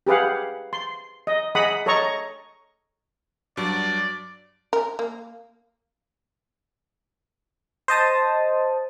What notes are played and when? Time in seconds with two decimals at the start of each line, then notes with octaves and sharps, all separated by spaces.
0.07 G4 G#4 B4 F5 F#5
0.73 C6
1.27 D#5
1.55 G#4 D#5 F#5 B5 D#6
1.86 A4 C#5 D#5 A#5 C#6
3.57 G2 F#3 D5 A5
4.73 A#4
4.99 A#3
7.88 C5 D#5 A5 D#6